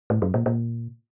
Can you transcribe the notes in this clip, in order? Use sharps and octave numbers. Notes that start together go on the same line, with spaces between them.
A2
F#2
A#2
A#2